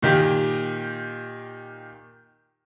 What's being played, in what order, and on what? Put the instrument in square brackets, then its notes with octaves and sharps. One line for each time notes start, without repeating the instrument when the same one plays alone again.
[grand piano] A#2 D#3 G4